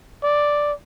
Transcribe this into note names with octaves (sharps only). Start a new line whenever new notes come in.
D5